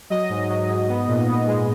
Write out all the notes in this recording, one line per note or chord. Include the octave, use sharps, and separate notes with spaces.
F#3 D#5
G#2
F#3
G#2
B3
A#2
B3
G#3